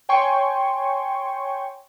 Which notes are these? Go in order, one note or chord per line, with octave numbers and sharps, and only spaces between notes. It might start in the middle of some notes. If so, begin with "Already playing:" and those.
C#5 G5 G#5 C6 C#6